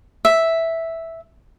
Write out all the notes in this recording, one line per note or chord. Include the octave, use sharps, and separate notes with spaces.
E5